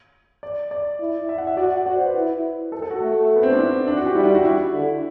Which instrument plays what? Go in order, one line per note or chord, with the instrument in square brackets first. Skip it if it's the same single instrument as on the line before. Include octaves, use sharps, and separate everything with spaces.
[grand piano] D5
D5
[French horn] E4
[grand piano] E5
F#5
E5
[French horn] F#4 [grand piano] D5
[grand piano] F#5
F#5
[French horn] F#4 [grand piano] D5
[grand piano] C5
B4
[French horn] E4
[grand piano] A4
A4
F#4
[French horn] A3
[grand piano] B3
C4
D4
E4
D4
F#4
G4
[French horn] G3 [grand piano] E4
[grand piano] E4
F#4
E4
[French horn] D3